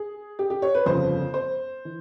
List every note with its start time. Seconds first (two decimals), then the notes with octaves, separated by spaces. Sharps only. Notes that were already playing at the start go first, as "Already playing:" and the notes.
Already playing: G#4
0.39 G4
0.50 G4
0.62 C#5
0.74 B4
0.86 G1 F2 C#3 C5
1.34 C5
1.85 E3